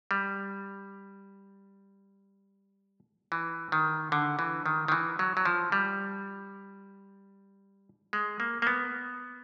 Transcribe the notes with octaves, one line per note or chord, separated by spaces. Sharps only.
G3
E3
D#3
D3
E3
D#3
D#3
E3
F#3
F#3
F3
G3
G#3
A#3
A#3
B3